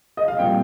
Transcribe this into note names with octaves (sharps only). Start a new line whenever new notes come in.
D#5
F5
A#2 G3 C4 G5